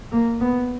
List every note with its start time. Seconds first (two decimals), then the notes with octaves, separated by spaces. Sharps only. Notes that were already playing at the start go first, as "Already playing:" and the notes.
0.12 A#3
0.40 B3